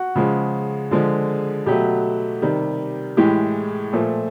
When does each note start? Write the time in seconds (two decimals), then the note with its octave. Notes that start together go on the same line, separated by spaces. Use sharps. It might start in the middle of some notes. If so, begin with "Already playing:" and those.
Already playing: F#4
0.16 C#3 F3 G#3
0.91 D3 F3 G#3
1.66 B2 F#3 A3 G4
2.42 C3 D#3 G3
3.17 A2 E3 G#3 G4
3.93 A#2 F3 A3